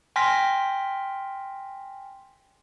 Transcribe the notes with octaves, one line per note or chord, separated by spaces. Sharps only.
G5 G#5 C6 F6 A#6 B6